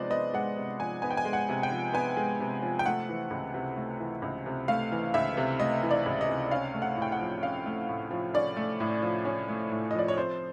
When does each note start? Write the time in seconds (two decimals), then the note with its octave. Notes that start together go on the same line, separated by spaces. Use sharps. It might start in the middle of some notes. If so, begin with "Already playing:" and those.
Already playing: C3 F3 G#3 B3 C5 D5 D#5
0.10 B3 D#5
0.34 G#3 F#5
0.57 C3
0.80 F3 G#5
1.02 B3 G#5
1.10 G5
1.17 G#5
1.25 G#3
1.33 F#5
1.49 C3
1.63 G5
1.71 F3
1.93 B3 G#5
2.17 G#3
2.40 C3
2.62 F3
2.79 G5
2.86 A3 F#5
3.09 E3
3.31 C#2
3.54 C3
3.77 A3
3.99 E3
4.22 C#2
4.46 C3
4.68 A3 F5
4.92 E3
5.14 C#2 E5
5.37 C3
5.60 A3 D#5
5.83 E3
5.91 D5
6.06 C#2
6.21 D#5
6.28 C3
6.51 C#4 F5
6.74 A3
6.82 F#5
6.97 A2
7.02 G5
7.12 F#5
7.20 F3
7.43 C#4 F5
7.66 A3
7.89 A2
8.11 F3
8.34 C#4 D5
8.57 A3
8.80 A2
9.02 F3
9.25 C#4
9.48 A3
9.71 A2
9.91 D#5
9.95 F3 D5
10.08 C#5
10.17 C4 C5